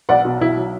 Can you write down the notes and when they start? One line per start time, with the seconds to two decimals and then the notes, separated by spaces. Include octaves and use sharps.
0.09 B1 D5 F#5
0.25 B2
0.41 B1 E4
0.57 F#3